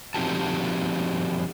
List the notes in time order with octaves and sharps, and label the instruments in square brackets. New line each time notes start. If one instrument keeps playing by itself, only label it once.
[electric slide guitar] F3 C4 D#4 F#4 G4 A5